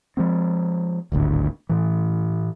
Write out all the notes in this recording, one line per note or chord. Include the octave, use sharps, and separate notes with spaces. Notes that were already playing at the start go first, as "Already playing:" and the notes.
F3 G#3 C4
D1 G#1 D2 D3
A2 E3